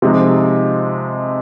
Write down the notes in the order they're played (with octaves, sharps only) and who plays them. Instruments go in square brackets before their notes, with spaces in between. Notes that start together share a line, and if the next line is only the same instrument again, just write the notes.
[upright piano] C3 F3 G#3 D#4